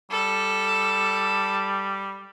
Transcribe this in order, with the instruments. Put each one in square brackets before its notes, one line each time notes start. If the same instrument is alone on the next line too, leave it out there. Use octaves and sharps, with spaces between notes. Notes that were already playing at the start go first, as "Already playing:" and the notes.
[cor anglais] G3 [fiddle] A4